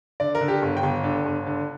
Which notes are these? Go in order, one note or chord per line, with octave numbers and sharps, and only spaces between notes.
D3 D5
A#4
D3
G4
G1
G5
G1
D3
G1
D3